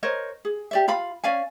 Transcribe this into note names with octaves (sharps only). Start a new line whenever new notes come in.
A#4 C5 C#5 D#5
G#4
G4 D5 E5
F4 F5 B5
C#4 D5 F5 G#5